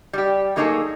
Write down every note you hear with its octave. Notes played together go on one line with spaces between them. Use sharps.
G3 G4
A2 F#3 A#3 D#4 G#4 A4